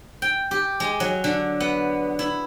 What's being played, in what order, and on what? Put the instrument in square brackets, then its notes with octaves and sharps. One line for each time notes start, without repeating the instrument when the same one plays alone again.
[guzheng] G5
G4
G#3
F#3
D3
B3
E4